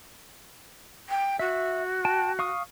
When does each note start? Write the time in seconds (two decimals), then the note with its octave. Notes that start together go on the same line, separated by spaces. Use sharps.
1.08 G5
1.39 F#4 E5
2.05 G5 A5
2.39 F5 C#6 D#6